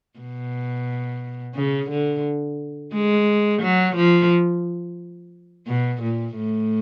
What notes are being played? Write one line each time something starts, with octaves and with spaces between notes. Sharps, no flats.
B2
C#3
D3
G#3
F#3
F3
B2
A#2
A2